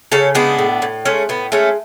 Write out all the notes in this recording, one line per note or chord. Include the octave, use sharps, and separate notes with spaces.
C#3 A4 C#5
G#3 B3 D4
A2
A2
G#3 A3 C#4
A2 B3
G#3 A3 C#4